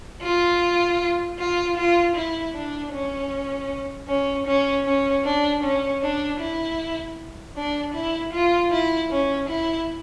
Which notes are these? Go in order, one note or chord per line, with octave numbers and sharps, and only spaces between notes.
F4
F4
F4
E4
D4
C#4
C#4
C#4
C#4
D4
C#4
D4
E4
D4
E4
F4
E4
C#4
E4